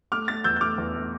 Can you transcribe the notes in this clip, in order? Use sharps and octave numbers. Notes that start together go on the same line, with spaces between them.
A3 D6 F6
A3 F6 A6
E2 E6 G6
G6
A3 D6 F6
E2
A3